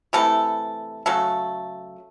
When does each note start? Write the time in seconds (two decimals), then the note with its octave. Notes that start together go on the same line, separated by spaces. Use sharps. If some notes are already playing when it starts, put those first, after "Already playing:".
0.13 C3 E3 A3 A4
1.06 C#3 F#3 A3 A4